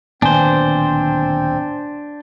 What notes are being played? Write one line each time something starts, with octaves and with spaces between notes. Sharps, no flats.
D1 A#2 D#3 B3 C4 D4 C5 G#5